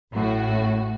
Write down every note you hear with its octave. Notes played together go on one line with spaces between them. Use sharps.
A1 A2 F#4